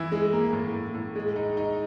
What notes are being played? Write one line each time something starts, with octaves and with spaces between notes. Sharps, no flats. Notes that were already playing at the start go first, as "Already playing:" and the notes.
Already playing: E3 E4
G#3
A#3
A2
A2
A2
G#3
D#4
D#4